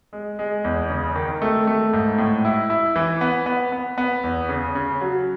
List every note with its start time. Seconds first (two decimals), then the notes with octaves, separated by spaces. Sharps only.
0.13 G#3
0.39 G#3
0.64 E2
0.90 C#3
1.16 D#3
1.42 A3
1.67 A3
1.93 G#2
2.18 A2
2.45 E4
2.70 E4
2.96 E3
3.21 B3
3.46 B3
3.72 B3
3.98 B3
4.24 E2
4.49 C#3
4.75 C#3
5.01 F#3